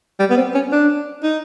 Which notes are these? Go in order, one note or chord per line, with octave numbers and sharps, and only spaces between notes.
G3
B3
C4
C#4
D4
D#4